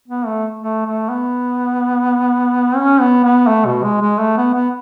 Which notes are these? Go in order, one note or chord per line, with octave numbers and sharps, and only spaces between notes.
B3
A3
A3
A3
B3
C#4
B3
B3
A3
B2
G#3
G#3
A3
B3
B3